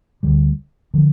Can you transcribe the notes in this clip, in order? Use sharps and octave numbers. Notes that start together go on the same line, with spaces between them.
D2 D3 G3
D3 F3